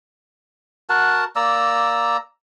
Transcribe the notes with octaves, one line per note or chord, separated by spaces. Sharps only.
F#4 A#4 F#5 A5
A#3 D5 A#5 E6